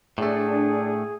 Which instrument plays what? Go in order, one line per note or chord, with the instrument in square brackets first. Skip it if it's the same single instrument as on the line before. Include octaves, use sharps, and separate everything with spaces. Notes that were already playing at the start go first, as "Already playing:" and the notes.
[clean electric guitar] A2 A3 [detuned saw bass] D4 [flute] G#4